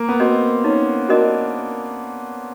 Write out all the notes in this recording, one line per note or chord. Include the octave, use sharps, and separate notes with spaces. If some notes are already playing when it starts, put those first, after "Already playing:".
Already playing: A#3
B3
C4 F#4 A#4 D#5
C#4 D#4
D4 F#4 A#4 D#5